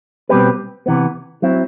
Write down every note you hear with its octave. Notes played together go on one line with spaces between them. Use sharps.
B2 G3 C4 G4 B4
C3 E3 B3
F#3 C4 E4